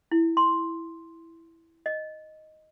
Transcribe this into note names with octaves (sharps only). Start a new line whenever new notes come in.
E4
C6
D#5